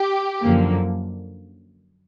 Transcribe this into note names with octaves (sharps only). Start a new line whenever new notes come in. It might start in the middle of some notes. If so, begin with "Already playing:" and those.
Already playing: G4
F#2 D3 F3 A#3